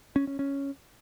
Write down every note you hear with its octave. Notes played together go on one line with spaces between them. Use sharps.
C#4
C#4
C#4